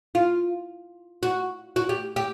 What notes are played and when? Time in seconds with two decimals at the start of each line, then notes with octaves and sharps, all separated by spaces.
0.15 F4
1.23 F#4
1.76 F#4
1.89 G4
2.16 G4